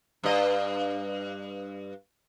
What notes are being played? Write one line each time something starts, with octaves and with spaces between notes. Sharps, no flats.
G2 D#5